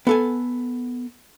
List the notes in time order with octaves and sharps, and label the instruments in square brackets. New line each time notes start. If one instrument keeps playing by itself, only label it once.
[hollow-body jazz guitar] B3 A4 G#5